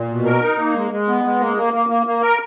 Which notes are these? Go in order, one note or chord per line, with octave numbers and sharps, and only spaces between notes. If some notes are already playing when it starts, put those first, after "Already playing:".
Already playing: A#2
B2
A#4
D#4
A#3
G#3
G#3
B3
G#3
A#3
A#3
A#3
A#3
A#3
A#4